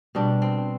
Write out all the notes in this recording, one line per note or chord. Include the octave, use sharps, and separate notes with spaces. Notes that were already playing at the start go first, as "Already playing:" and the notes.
B2 G3 D4
C4